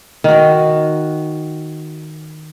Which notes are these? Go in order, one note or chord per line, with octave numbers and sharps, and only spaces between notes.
D#3 F#4